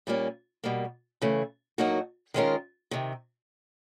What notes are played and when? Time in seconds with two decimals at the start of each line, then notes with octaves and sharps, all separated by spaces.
0.07 A#2 G3 A#3 C#4
0.64 B2 G3 A#3
1.22 C#3 E3 A3
1.78 A2 F#3 A#3 D#4 F#4
2.34 D#3 G#3 C#4 F4 A#4
2.91 C3 D#3